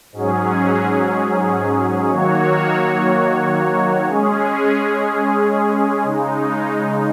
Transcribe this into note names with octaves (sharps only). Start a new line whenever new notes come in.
G#2 F#3 C#4 G#4
D#3 F#3 A#3 F#4 C#5
G#3 C#4 G#4
C#3 G#3 D#4